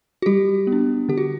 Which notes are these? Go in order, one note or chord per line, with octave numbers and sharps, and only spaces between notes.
F#4
G3 G4
B3
D4
D3 G4
F#4